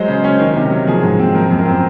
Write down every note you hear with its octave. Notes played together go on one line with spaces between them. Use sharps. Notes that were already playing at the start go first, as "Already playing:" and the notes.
Already playing: F#3 G#3 C5
C#3
C#4
D#3
C3
F#3
F3 G#4
G#2
C4
F3 A#4
F#2
A#4
C4